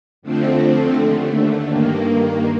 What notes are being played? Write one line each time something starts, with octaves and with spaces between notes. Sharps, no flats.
F2 D3 F3 A3 C4
D#2 D3 A3
G2 D#3 A#3